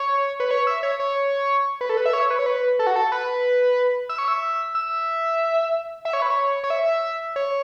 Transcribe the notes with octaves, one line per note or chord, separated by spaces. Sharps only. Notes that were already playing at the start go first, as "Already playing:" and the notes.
Already playing: C#5
B4
C#5
E5
C#5
C#5
B4
A4
B4
E5
C#5
B4
C#5
B4
A4
F#4
A4
B4
E5
C#5
E5
E5
E5
C#5
B4
C#5
C#5
E5
C#5